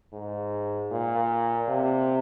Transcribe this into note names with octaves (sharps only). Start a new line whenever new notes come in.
G#2
A#2
C3